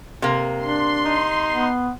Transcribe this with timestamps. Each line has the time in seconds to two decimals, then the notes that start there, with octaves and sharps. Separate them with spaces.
0.22 C3 A#3
0.61 D4 C6
1.05 D#4
1.50 B3